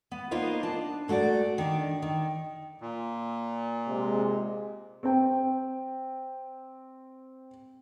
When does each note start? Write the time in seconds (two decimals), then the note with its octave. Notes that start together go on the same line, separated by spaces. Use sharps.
0.11 B3
0.31 A#3 B3 D#4 F4 A#4 C5
0.63 D4 A5
1.08 A#2 A3 F#4 G#4 D5
1.58 D#3 D4
2.02 D#3
2.81 A#2
3.88 C3 G#3
5.03 C4 G5